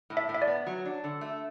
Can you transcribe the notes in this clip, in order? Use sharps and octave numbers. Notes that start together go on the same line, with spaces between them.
A2
E5
A2
E5
D5
B3
F#3
D4
D3
A3